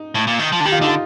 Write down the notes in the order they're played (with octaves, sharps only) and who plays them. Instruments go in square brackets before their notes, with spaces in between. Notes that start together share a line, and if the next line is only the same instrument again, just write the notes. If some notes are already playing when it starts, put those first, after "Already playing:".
Already playing: [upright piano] D#4
[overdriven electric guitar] A2
A#2
D#3
F3
D3
[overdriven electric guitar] D#3 [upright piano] G4
[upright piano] F4
[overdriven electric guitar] D3 [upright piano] D#4
[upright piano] F4